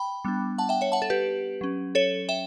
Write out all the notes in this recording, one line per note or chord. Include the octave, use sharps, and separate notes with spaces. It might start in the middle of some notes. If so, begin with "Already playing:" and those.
Already playing: G5 B5
G3 B3 D4
F#5 A5
E5 G5
C#5 E5
F#5 A5
A4
G4 B4
F#3 C#4
A4 C#5
E5 G5